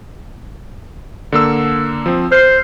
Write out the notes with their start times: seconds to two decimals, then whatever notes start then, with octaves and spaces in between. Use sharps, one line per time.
1.32 D3 A#3 E6
2.06 F3 C4
2.32 C5 F6 C7